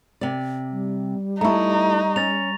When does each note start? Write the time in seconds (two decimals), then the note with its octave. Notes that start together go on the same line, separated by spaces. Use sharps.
0.21 C3 D5
0.71 G3
1.41 A3 D#4 E4 A#5 C#6
2.16 C#4 A6 A#6 F7